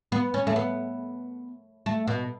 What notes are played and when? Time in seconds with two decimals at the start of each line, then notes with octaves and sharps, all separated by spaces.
0.12 B3
0.34 C#4
0.47 A3
0.56 B3
1.86 A3
2.08 B2